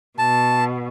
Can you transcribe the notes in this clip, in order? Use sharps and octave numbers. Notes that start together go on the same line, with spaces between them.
B2 A5